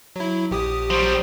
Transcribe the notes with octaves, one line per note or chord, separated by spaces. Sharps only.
F#3 E4
A#1 G4 D#6
F#3 G3 C5